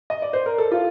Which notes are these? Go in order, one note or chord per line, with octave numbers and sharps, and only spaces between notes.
D#5
D5
C5
A#4
A4
F4